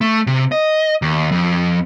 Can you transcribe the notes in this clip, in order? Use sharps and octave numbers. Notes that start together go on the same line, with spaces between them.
A3
C3
D#5
D#2
F2